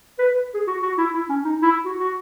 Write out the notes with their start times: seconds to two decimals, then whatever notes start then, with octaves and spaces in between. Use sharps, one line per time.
0.19 B4
0.31 B4
0.54 G#4
0.67 F#4
0.82 F#4
0.98 E4
1.14 E4
1.29 C#4
1.45 D#4
1.62 E4
1.85 F#4
1.99 F#4